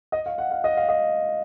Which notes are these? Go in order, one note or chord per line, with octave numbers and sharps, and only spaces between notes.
D#5
F5
F#5
F5
D#5
F5
D#5